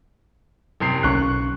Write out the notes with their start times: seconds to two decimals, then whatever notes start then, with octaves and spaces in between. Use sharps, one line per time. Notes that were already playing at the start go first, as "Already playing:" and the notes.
0.80 F#1 C3 C7
1.03 B1 C#3 C#4 C#6 F#6